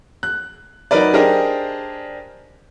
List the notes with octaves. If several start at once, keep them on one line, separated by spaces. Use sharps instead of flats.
F#6
F#3 D#4 A#4 B4 D5
D4 G4 G#4 A#4 C5 D#5